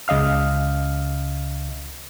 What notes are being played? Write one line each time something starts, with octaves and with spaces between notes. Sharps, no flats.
C#2 C#3 D#5 F5 F6